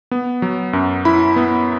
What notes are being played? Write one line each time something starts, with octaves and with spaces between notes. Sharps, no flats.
B3
F#3
F#2
E4 B5
B3